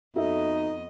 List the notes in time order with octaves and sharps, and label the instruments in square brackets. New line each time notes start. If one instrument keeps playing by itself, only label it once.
[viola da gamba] F2 B3 D#5 [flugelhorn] D#4 [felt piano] F#4 A4 E5